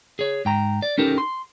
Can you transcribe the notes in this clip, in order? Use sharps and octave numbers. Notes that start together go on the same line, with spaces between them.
G#4 C#5
G#2 G5 A#5
D5
C#4 D#4 G4 A4 A#4
C6